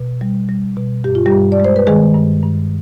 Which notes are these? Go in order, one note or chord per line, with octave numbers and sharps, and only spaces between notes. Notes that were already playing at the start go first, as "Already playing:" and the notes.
Already playing: B2
G3
G3
B2
G2 G4
F4
G3 G4
G2
D5
G#3 C5
B4
D#3 G#3 G#4
G2
G2